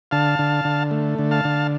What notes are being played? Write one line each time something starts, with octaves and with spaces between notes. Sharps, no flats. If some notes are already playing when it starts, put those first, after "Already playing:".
D3 F5 A5
D3
D3
A3
D3
F5 A5
D3